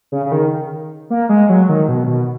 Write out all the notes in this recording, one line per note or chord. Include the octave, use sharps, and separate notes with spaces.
C#3
C#3
D#3
A#3
G#3
F#3
D#3
B2
B2